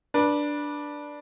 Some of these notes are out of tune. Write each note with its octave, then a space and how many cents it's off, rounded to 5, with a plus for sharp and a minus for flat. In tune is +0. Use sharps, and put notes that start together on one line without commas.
D4 +0 B4 -25